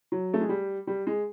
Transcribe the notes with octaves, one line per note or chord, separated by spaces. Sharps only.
F#3
A3
G#3
G3
G3
G#3